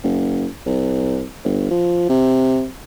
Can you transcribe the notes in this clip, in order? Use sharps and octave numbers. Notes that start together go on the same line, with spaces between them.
F#1
C2
G1
F3
C3